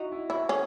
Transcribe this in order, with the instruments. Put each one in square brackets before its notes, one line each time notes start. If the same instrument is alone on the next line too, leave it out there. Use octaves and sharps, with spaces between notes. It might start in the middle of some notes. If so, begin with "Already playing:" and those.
Already playing: [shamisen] D#4 [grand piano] E4 F#4
[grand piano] E4
[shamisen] E4 [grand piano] F#4
[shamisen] C#4 [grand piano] G#4